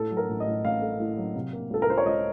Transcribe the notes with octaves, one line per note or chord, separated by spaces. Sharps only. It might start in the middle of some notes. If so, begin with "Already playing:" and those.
Already playing: A2 A4
F#3
A#4
A1
D#5
A2
A1 F5
A3
A2
F#3
C3
A#3
C#2 A4
A#4
C#2 C5
C#5
C#2 D#5